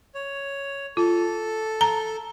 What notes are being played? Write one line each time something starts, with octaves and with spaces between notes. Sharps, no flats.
C#5
F4 A4
A#5